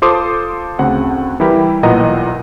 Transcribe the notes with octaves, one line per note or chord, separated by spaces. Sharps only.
F4 A4 C5 C6 D6 D#6
D2 C#3 C4 F#5
E3 G3 E4 G4 A#4 B5
B1 A#2 E3 D#5 F#5 A#5